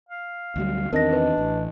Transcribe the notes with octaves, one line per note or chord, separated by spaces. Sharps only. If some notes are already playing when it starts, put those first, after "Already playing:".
F5
D2 F#3 G3
E2 D#3 C4 D4 A#4 D#5 A#6
B4 D#5
A1